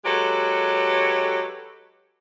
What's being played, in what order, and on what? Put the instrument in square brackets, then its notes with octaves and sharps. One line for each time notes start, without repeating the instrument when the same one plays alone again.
[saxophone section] F#3 G#3 G4 A4 B4 C#5